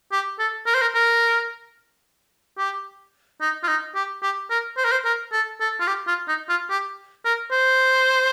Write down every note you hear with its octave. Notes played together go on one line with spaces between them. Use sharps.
G4
A4
A#4
C5
A#4
A#4
G4
D#4
F4
D#4
G4
G4
A#4
C5
A#4
C5
A#4
A4
A4
F4
G4
F4
D#4
F4
G4
A#4
C5